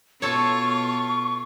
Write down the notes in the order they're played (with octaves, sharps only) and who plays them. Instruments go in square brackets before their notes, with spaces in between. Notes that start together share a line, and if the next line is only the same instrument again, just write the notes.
[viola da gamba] B2 F4 [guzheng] A4 C#5 [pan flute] C#6